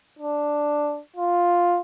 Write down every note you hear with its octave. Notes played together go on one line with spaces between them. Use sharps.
D4
F4